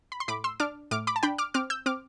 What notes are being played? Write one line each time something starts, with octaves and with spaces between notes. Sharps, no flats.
B5
C6
A2 B5 D6
C6 E6
D4 D6 F6
A2 D6 F6
B5 D6
A5
D4 G5 B5
D6 F6
C4 D6 F6
E6 G6
C4 D6 F6